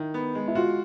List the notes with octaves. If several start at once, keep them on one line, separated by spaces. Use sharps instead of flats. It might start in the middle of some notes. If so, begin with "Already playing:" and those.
Already playing: D#3 E4
B3
G#3
E4
F4 F#4